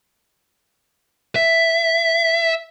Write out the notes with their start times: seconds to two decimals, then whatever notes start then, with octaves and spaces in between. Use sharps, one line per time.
1.36 E5